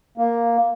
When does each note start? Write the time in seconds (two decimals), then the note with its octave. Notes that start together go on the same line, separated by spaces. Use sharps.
0.18 A#3